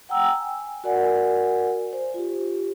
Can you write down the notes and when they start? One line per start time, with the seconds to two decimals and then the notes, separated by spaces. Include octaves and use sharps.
0.09 F#5 G5 A#5 E6
0.25 G#5
0.84 F#4 A#4 D5 F#5 G#5
1.93 C5
2.14 F4 G4